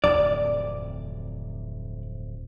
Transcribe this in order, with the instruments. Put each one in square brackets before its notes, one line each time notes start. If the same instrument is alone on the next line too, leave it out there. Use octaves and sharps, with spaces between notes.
[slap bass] D1 F2 C3 [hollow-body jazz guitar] D5